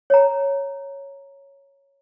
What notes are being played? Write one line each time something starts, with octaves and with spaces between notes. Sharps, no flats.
C#5 A#5